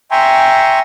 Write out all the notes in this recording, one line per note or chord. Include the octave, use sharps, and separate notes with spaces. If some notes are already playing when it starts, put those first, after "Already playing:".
E5 G5 G#5 A#5 C6 C#6